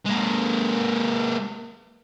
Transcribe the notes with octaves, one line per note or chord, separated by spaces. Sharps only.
G#3 A#3